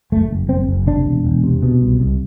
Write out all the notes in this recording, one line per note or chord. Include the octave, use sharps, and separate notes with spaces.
F#1 A3
F#1
F#1 C4
F#1
C3 D4
E1
E1
C3
B2
C2
C2